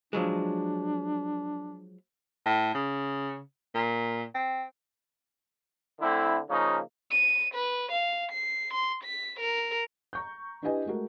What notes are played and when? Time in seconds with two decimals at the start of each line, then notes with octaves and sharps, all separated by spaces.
0.13 F3 F#3 G#3 D4
2.46 A2
2.74 C#3
3.75 A#2
4.35 C4
6.01 D3 A3 C4 E4
6.50 C#3 F3 A#3 C#4 D#4
7.11 D#7
7.54 B4
7.92 F5
8.32 C7
8.74 C6
9.04 B6
9.40 A#4
10.13 A#5 C#6 G6
10.63 D4 E4 G4 B4 D#5 G#5
10.86 G#3 A3 F#4 A#4